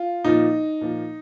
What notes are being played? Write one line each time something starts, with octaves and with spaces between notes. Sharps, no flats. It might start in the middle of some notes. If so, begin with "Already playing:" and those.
Already playing: F4
A#2 F3 D#4
A#2 F3